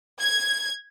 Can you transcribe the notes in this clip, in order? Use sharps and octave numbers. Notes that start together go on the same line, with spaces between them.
G#6